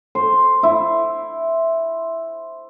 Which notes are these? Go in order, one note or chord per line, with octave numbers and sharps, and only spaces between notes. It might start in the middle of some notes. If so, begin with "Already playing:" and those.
C5
E4